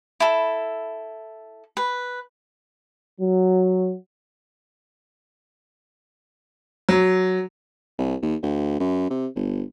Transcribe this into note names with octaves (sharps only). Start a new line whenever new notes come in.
E4 A4
B4
F#3
F#3
C2
D#2
D2
F#2
C3
G1